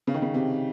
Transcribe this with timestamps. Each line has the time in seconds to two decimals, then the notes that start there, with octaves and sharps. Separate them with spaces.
0.07 C#3
0.14 D#3
0.22 C#3
0.34 C3